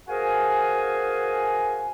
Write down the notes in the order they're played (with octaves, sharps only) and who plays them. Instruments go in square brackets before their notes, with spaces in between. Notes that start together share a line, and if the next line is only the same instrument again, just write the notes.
[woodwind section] F#4 G#4 A#4 C5 F5 G#5